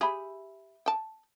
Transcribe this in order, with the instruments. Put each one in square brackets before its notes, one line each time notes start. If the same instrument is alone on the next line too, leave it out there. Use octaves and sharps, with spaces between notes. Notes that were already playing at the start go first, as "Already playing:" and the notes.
[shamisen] G4 G#4 [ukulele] E5 B5
[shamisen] G5 A5